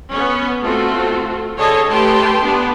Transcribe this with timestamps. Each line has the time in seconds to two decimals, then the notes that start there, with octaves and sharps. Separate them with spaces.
0.12 B3 C#4
0.63 A3 C4 F4 F#4 A4
1.57 D3 G#4 A4 C#5 D#5 A5
1.90 A3 G4 B4 G5 A5 C6
2.42 B3 D4 G4 B4